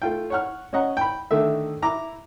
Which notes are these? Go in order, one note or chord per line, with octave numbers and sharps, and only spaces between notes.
A3 F4 G5
C#5 F#5 F6
C#4 C#5 D#5 F#5 A#5
G5 B5
D3 D#3 A3 E5
E4 A#5 D6